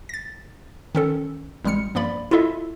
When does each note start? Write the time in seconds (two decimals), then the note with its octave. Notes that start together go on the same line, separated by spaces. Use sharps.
0.09 A6 A#6
0.95 D#3 C#4 A4
1.64 A1 G3 G#3 F6 C#7
1.95 G2 F3 A#3 D5 B5
2.31 E4 F4 A4 D#5 E5